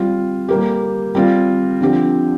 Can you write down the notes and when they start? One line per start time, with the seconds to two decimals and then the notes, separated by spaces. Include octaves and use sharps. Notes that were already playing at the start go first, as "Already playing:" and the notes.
Already playing: G3 C4 F4
0.49 G3 A#3 G4
1.15 G3 C4 F4
1.81 D3 F3 C4 G4